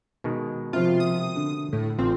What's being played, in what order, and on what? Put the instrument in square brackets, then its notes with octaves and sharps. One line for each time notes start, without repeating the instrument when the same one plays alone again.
[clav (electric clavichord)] B2 D#3 G#3
[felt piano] C3 F3 [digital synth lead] F4
[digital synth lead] D#6
[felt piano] D3
[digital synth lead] A2
[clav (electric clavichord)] A1 [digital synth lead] C4 [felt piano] F4